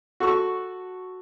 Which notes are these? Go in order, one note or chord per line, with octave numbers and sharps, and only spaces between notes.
F#4 A4 C#6